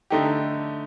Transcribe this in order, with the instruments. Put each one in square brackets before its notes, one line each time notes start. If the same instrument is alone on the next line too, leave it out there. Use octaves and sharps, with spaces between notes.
[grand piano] D3 A3 D#4 G4